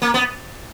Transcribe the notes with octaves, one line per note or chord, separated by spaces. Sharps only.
A#3
B3